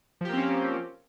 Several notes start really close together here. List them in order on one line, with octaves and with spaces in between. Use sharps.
F3 G4 A#3 C4 C#4